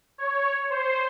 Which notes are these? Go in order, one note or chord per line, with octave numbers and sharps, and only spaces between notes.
C#5
C5